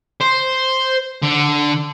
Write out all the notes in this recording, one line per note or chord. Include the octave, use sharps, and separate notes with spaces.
C5
D3